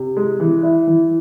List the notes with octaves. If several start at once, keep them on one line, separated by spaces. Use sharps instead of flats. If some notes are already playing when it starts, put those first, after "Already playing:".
Already playing: C3
G#3
E3
E4
E3